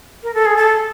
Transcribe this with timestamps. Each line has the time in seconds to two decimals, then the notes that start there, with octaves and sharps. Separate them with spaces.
0.23 A#4
0.34 A4
0.45 G#4
0.57 A4